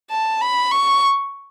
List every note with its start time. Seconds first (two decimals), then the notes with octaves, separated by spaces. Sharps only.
0.10 A5
0.41 B5
0.71 C#6